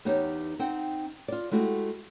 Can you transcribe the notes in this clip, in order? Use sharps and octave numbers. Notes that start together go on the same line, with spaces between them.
E2 B3 D#4 G4 C#5
C4 D#4 F#5 G5
F4 D5
G#3 A3 E4 F#4 G4